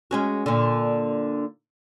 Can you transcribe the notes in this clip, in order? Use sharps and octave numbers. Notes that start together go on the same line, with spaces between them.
G#3 C#4 F#4
A#2 D3